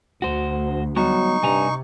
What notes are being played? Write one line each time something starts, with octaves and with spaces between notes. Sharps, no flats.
D2 F#4 C5
F#3 G3 B3 D#4 F#4 C#6
G2 C3 G3 G#5 A#5